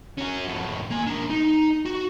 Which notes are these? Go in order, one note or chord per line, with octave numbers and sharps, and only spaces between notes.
C#4 F#4
F2 A2
A#3 G#5
D4 A#4
D#4
F#4